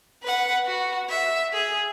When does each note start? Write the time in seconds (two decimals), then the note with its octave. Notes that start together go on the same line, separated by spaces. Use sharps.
0.23 B4 F#5
0.66 F#4
1.09 E5
1.53 G#4